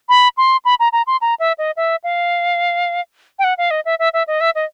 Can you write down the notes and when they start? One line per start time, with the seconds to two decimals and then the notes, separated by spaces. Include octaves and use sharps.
0.09 B5
0.37 C6
0.65 B5
0.80 A#5
0.92 A#5
1.07 C6
1.21 A#5
1.39 E5
1.58 D#5
1.76 E5
2.04 F5
3.39 G5
3.44 F#5
3.58 F5
3.71 D#5
3.85 E5
3.99 E5
4.13 E5
4.27 D#5
4.40 E5
4.55 D#5